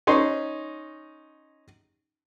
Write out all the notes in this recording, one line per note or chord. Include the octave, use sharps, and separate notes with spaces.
C#4 D#4 C6